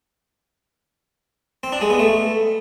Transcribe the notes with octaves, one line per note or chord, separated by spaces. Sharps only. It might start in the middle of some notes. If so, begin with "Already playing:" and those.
C4
D4
G#3
B3
A3